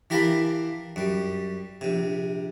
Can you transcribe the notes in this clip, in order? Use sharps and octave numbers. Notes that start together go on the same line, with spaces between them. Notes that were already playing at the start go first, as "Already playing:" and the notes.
E3 G4 A#4 F5 A5 B5
F#2 G3
A#1 C3